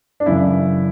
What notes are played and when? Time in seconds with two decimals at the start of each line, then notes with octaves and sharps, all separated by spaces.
0.20 D4
0.26 F#2 C#3 E3 E4